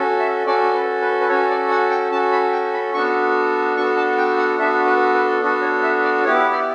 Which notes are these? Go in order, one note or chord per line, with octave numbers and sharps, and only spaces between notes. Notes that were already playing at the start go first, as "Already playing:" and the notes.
Already playing: C#4 F#4 A4
E5
C#4 F#4 A4 D5
B4
B4
B4
C#4 F#4 A4 C#5
D5
F#5
G5
C#4 F#4 A4 A5
B5
G5
B5
B3 D4 F#4 A4 C#6
B3 D4 F#4 A4 C#6
A5
G5
F#5
B3 D4 F#4 A4 E5
B4
B4
B3 D4 F#4 A4
C#5
E5
D5
B3 E4 G4 C#5
D5